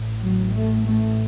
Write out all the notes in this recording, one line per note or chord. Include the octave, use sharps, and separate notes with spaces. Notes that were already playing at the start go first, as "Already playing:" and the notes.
Already playing: A1 A2
F#3
A3
A3